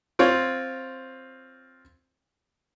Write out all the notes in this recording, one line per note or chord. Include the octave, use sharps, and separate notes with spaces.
C4 F4 C#5